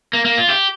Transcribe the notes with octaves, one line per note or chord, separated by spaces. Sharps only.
A#3
A#3
F4
G4